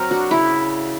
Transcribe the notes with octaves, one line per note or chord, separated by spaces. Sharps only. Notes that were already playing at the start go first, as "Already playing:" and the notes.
Already playing: F#3 C4 A#4
D4 F#4
C#3 E4